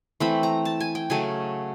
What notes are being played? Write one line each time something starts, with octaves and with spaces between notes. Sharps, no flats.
E3 A3 C4 B5
A#5
A5
G#5
G5
C#3 F#3 A3 G#5